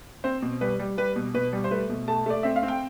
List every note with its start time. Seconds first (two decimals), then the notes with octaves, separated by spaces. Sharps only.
0.24 C4 C5
0.42 B2
0.61 G3 B4
0.79 G3
0.97 G3 B4
1.16 B2
1.34 B2 B4
1.53 G3
1.64 C5
1.71 A3 B4
1.90 B2
2.08 A3 A5
2.26 A3 D5
2.43 C4 E5
2.56 F5
2.63 C4
2.68 G5